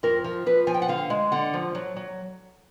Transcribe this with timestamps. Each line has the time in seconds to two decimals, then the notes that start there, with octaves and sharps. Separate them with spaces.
0.03 F2 A#4
0.24 F3
0.46 F3 B4
0.67 F3 G#5
0.74 G5
0.82 F#5
0.88 D3 F5
1.10 G#3
1.32 D3 F#5
1.54 F3
1.75 F#3
1.96 F#3